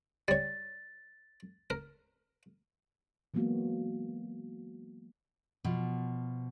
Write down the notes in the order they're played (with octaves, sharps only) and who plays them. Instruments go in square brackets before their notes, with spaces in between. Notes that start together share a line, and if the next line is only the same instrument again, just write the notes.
[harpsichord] G3 C#5 [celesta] A6
[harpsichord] A#4
[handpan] E3 F#3 G#3 A#3 B3 F#4
[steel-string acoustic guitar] B2 F3